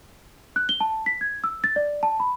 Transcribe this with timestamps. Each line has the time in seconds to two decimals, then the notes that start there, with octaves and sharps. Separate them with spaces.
0.56 F#6
0.69 G7
0.80 A5
1.06 B6
1.21 G#6
1.44 E6
1.64 A6
1.76 D5
2.03 A5
2.20 B5